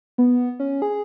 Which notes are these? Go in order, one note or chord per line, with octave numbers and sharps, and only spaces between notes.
B3
C#4
G#4